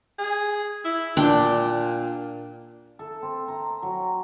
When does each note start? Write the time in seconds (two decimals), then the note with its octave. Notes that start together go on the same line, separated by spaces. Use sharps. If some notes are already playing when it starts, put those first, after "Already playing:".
0.19 G#4
0.85 E4
1.17 A#2 D4 G5
2.99 A4
3.22 C4
3.48 A#5
3.83 F#3